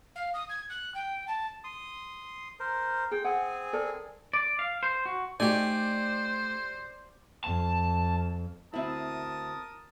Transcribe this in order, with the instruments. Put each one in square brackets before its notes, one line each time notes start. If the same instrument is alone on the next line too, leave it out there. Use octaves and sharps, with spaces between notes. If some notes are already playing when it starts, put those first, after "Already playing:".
[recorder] F5
D#6
G#6
F#6
G5
A5
[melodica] C6 D#6
A#4 C5
[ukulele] G#4 [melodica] G5
[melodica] C4 G#4 G#5 [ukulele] F#5
[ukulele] A4 A#4 D5
[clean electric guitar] D5
F5
C5
F#4
[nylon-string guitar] A3 D#4 [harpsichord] G4 G#5 [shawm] C5 [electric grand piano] D5
[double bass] F2 [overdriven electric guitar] A5
[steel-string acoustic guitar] D2 C4 [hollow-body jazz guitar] E4 E5 [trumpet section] A#4 A5 D#6